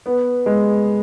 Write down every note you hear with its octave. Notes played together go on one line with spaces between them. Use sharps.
B3
G#3